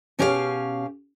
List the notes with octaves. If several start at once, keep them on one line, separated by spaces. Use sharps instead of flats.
B2 C#4 G4 G#4 C5 F5